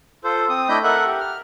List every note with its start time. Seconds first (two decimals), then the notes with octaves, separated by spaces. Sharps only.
0.24 F4 A4 C5
0.49 C4 D#6
0.69 A3 D4 E4 D#5 B5 G6
0.84 A4 A#4 E5 F#5 F#6
1.05 G4
1.20 F6